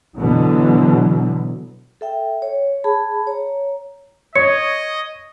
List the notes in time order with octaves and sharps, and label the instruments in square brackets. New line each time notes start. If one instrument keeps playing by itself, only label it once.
[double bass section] B2 D3 E3 F#3
[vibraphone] A4 E5 G5
C#5
G#4 A5 B5
C#5 A#5
[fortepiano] C#5 [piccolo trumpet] D#5 [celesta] C#7